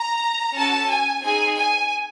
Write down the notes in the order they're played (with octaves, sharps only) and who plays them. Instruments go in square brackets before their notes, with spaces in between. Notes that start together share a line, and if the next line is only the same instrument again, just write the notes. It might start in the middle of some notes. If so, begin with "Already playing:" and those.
Already playing: [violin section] A#5
C#4 F#4 A4 A5
G#5
C4 D#4 G#4 G#5
G#5